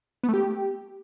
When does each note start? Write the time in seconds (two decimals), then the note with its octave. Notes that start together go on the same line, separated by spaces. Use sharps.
0.24 B3
0.29 A3
0.34 G4